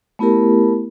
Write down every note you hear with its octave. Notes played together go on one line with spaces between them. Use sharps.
A3 B3 E4 G4 A#4